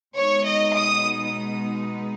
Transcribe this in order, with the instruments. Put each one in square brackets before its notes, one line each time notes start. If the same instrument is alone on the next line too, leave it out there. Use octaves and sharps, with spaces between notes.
[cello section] B2 G#3 B3 D#4 [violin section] C#5
[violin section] D#5
D#6